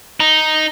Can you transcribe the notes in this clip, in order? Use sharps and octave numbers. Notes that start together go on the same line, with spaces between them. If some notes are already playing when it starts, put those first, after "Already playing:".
D#4